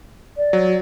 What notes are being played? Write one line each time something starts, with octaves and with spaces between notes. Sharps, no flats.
D5
F#3